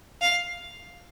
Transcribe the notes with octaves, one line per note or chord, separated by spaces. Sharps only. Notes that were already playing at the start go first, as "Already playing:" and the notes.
F5